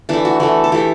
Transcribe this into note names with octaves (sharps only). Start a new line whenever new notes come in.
E3 A3 D4
F#4
E3 A3
A4
E3 A3 G4